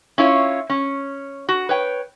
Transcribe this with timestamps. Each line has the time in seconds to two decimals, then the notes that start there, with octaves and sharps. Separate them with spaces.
0.18 C#4 E4 F4 C#5
0.70 C#4
1.49 F#4
1.69 B4 C#5 G5